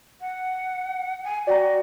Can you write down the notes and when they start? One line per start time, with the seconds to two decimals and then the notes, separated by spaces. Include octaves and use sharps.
0.21 F#5
1.24 G#5
1.47 F#4 D5 G5 A#5